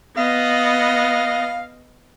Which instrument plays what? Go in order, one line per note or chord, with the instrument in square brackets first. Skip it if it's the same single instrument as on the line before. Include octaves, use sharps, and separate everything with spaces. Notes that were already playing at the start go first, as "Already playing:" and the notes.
[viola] B3 D#5 [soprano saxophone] F5